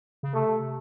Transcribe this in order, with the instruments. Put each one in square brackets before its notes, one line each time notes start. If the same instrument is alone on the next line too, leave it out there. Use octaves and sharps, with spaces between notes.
[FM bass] C#3
[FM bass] C3 [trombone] A3